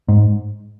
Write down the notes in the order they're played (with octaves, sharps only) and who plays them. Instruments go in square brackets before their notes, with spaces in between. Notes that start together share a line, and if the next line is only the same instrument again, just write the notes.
[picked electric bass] G#2